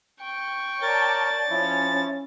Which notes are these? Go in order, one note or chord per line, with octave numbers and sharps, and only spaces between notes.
G5 C#6
A#4 C#5 D5 A5 A6
F3 C#4 E4